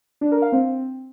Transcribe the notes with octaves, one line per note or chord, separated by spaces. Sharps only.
D4
A#4
F5
C4